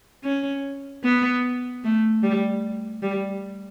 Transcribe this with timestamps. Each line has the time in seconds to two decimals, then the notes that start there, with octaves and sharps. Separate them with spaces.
0.24 C#4
1.04 B3
1.84 A3
2.23 G3
3.03 G3